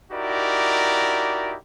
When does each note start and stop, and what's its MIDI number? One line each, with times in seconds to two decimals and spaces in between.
0.12 1.56 63
0.12 1.56 64
0.12 1.56 66
0.12 1.56 67
0.12 1.56 70
0.12 1.56 74